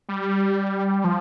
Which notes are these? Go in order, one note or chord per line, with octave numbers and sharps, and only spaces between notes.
G3
F3